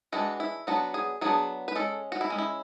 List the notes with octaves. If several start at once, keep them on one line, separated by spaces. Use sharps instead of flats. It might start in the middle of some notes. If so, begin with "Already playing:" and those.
E3 G#3 D4 F#4
E4
F#3 B3 D4 F#4
G#4
F#3 B3 D4 G#4
B4
G#3 C#4 A4
F#4
E4
G#3 C#4
E4